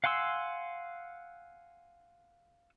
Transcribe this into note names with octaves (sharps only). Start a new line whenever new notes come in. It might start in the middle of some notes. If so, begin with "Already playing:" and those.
F5 F#5 G#5 C6 E6